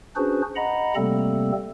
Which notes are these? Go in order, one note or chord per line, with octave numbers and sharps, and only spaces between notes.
C#4 D4 F#4 G#4 B4 C5
D#5 F#5 A#5 B5
C3 G3 A3 A#3 C4 A4